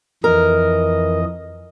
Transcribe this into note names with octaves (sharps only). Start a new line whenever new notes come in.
F2 E3 A#4 D#5